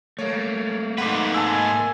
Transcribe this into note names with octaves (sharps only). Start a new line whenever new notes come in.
A3 A#3 C#5
G#2 B4 F#5 C6 D6
G#5 A5 C6 E6